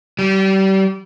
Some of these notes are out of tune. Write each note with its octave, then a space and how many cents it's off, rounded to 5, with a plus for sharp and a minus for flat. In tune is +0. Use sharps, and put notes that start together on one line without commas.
G3 -30